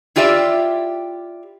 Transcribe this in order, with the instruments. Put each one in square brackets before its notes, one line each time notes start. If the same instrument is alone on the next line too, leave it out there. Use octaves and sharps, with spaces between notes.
[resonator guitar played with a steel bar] E4 F4 G4 D5 E5